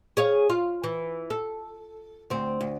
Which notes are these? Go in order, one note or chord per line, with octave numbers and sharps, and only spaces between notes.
G#4 C#5 F5
F4
E3
A4
D2 C4
D2